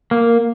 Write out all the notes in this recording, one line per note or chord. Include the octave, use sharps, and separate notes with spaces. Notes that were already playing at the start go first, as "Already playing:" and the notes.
A#3